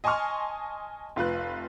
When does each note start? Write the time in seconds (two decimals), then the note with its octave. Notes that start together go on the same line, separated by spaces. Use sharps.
0.04 D#5 G#5 A5 C6 C#6 F6
1.16 F1 F4 B4 F#6